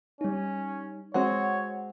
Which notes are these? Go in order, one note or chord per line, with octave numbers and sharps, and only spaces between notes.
G3 C#4 D#4
G#3 C4 F#4 C#5 F#5